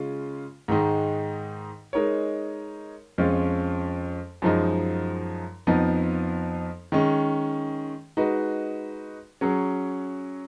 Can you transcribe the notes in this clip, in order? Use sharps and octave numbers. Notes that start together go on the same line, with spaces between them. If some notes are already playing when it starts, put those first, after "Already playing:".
Already playing: C#3 G#3 C#4 F4
G#2 D#3 G#3 D#4
G#3 D#4 A#4 C#5
F2 F3 G#3 C#4 F4
F#2 F3 G#3 D#4
F2 F3 B3 D#4
D#3 G#3 C#4
G#3 D#4 F#4 B4
F#3 C#4 G#4